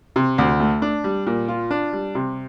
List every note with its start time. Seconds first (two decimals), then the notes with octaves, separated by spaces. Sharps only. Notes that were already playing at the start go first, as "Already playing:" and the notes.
0.16 C3
0.38 D2
0.60 A3
0.82 D4
1.04 G3
1.27 A#2
1.48 F4
1.71 D4
1.93 G3
2.15 C3